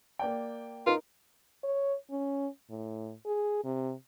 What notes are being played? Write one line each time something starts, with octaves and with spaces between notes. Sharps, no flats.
A#3 D5 G5
D#4 F4 A#4
C#5
C#4
A2
G#4
C3